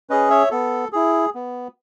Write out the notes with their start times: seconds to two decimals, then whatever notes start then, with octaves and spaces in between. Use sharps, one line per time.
0.10 C#4 G#4 B4 D#5
0.30 C#5 E5
0.51 B3 A4
0.92 E4 G#4
1.35 B3